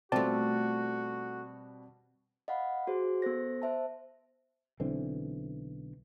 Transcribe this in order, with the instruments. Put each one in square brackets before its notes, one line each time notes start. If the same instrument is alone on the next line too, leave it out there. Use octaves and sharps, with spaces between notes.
[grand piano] B2 G3 [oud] A3 F4 [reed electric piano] C4 D5 A5 [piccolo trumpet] F#4
[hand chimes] D#5 F5 F#5 B5
F#4 G#4 C5
B3 A4 C5 A#6
C5 E5 A5
[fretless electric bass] B1 D3 E3 C4